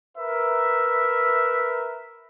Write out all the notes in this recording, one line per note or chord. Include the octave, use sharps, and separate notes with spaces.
A#4 B4 E5